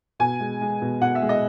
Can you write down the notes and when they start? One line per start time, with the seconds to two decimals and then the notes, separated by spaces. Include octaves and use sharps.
0.20 B2 G#5
0.40 G#3
0.61 G#3
0.82 B2
1.01 B2 F#5
1.15 E5
1.22 G#3
1.29 D#5